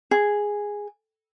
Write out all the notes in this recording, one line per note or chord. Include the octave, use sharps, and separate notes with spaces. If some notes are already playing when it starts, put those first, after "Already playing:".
G#4